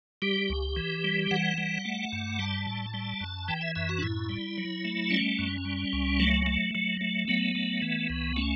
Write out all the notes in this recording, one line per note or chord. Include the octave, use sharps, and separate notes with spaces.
G3 G4
C#2
E3
G3
E3 F#5
G3
A3
G2
G3 A5
A2
G3
F#2
E3 G5
E5
F#2 E5
F#4
D4
A2 E4
G3
F#3
A3
G3 C#4
F#2
G3
C#2
F#3 A3
A3
F#3
A3
F#3 B3
A3
E3
C#2
A3 C#4